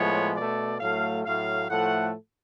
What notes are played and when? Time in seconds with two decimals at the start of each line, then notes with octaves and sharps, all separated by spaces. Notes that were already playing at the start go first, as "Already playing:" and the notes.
Already playing: A2 F3 G#3 B3 C#5
0.36 B2 A3 D5
0.80 A2 F#3 A3 F5
1.25 A2 F#3 A3 F5
1.70 A2 F3 A3 F#5